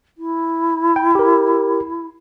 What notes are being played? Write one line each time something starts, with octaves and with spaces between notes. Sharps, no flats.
E4
G5
G4 A#4